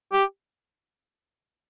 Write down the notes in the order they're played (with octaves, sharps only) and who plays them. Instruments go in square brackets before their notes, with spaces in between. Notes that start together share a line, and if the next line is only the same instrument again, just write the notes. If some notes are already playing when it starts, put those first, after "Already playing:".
[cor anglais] G4